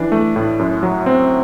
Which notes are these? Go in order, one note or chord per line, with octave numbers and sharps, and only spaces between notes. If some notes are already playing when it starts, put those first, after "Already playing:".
Already playing: E3 D4
A3
A2
F#2
F#3
C4